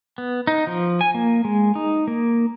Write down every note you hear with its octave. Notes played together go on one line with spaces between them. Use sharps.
B3
D#4
F3
G#5
A#3
G#3
D#4
A#3